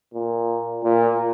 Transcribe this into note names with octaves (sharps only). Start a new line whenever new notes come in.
A#2
A#2